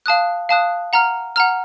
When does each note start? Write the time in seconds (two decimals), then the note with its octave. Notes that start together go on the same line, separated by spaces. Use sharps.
0.06 F5 A5 D#6 F#6
0.49 F5 A5 D#6 F#6
0.93 F#5 A#5 F6
1.36 F#5 A#5 F6